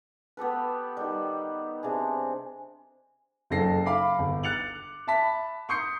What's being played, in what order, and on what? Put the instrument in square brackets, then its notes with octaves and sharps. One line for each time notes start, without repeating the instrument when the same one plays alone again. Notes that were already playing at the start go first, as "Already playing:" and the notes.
[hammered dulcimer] B3 G4 A4 B4
D#3 G3
C3 D4 G#4
[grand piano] F#1 F#2 A4 A#6 C7
F5 B5 D6 C7
G1
F#6 A6 C#7 F7 F#7
E5 A5 B5 B6
C6 C#6 D#6 G6 C7 C#7